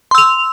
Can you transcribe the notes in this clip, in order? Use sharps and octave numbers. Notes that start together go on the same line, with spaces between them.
C6 E6 F7